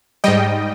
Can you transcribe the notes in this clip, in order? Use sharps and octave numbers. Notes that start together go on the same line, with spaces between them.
G#2 G3 D#5 G5